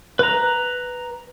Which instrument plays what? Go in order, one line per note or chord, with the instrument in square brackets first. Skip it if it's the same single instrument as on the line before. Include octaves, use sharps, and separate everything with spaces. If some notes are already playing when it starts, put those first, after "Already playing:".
[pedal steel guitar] B4 A#5